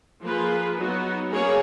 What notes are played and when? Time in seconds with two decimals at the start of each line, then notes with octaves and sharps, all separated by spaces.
0.22 F3 A#3 F4 G#4 B4
0.76 F#3 B3 D#4 F#4
1.30 A#3 C#4 G#4 C#5